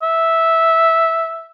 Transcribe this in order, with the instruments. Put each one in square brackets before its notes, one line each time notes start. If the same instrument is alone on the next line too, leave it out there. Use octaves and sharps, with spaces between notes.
[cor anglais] E5